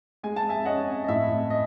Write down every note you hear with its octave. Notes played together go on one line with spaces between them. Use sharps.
G#3 G#5
A5
E5 G#5
C#4 D#5 F#5
D#5
A2 E5
D#5